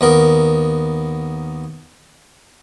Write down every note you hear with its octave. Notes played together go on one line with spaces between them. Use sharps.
D#2 B3 A#4